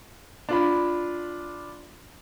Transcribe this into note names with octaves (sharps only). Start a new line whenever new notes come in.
D4 F4 B5